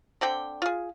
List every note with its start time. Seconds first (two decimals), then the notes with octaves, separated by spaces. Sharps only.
0.21 D3 C4 D5 G5
0.62 F4 G#4